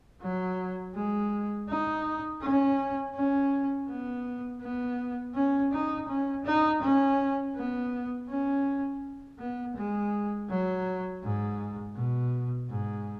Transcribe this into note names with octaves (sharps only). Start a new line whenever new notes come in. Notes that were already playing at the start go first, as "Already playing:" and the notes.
F#3
G#3
D#4
C#4
C#4
B3
B3
C#4
D#4
C#4
D#4
C#4
B3
C#4
B3
G#3
F#3
G#2
B2
G#2